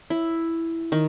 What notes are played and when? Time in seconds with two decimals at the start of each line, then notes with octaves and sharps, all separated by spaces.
0.10 E4
0.92 D#3